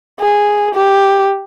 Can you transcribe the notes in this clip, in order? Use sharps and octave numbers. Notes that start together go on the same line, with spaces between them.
G#4
G4